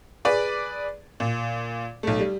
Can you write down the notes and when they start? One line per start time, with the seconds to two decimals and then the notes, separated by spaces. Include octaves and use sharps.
0.25 G#4 B4 D5
1.20 A#2
2.03 B1 A3
2.20 G3